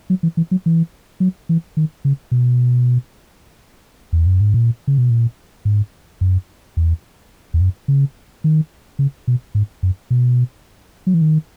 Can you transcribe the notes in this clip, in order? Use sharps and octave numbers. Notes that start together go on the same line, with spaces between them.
F#3
E3
E3
F#3
E3
F#3
E3
D#3
C#3
B2
E2
F#2
G#2
A#2
C#3
B2
A#2
G#2
F#2
E2
E2
F#2
C#3
D#3
C#3
B2
G#2
F#2
B2
F#3
E3
D#3